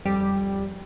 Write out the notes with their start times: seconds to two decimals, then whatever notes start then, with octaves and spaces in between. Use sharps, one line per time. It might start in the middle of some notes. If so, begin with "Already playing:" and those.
0.05 F2 G3 G4